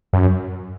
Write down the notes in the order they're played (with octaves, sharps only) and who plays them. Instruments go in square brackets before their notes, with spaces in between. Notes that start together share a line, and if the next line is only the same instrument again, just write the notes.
[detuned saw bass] F#2